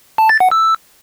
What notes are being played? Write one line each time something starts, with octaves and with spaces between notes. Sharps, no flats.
A5
A6
F#5
E6